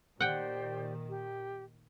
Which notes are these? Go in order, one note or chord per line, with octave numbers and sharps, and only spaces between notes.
A#2 D#3 G4 C5 D5 F#5 G5
G4